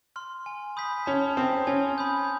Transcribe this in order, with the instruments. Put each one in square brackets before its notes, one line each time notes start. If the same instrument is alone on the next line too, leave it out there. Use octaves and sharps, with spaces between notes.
[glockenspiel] C6 F6
G#5
B5 D#6 G6 B6
[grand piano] C#4 [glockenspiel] A5
[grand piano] C4 [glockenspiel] C6 D#6
[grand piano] C#4 [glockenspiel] G#5
[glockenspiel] B5 D#6 G6